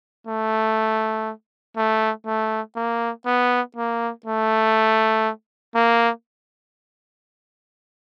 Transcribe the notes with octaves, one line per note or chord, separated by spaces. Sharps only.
A3
A3
A3
A#3
B3
A#3
A3
A#3